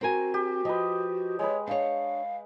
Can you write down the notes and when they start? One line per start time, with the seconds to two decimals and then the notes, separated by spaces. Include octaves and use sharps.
0.01 C4 F#4 A#4 G#5
0.34 G4
0.65 F3 B4 D#5
1.39 G#3 B4 C#5
1.68 D4 C#5 F5